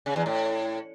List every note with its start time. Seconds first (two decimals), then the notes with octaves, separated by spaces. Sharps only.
0.06 C#3
0.16 E2
0.26 A2